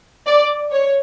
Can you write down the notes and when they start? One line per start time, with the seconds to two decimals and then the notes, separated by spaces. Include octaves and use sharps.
0.27 D5
0.72 C#5